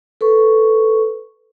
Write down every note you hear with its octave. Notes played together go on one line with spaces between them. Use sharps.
A4 B4 C#6